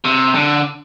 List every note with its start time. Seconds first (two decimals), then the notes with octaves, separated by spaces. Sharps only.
0.05 C3
0.34 D3